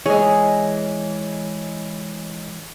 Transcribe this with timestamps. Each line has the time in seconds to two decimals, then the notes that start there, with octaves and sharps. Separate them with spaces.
0.06 E3 G#3 G#4 C#5 D#5